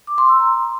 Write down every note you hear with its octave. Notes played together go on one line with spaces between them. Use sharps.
D6
C6
E6
A#5